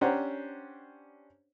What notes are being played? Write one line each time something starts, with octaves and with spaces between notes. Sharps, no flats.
C#4 D4 G4 C5 F#5 A#5